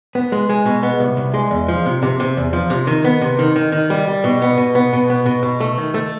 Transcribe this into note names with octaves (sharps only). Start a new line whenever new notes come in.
B3
G#3
G#3
B2
B3
C2
C2
G#3
E2
F3
C3
C3
C3
E2
F3
C3
D#3
B3
C3
D#3
D#3
D#3
G3
G3
B2
B3
B2
B3
B2
B3
B2
B2
A3
D#3
A3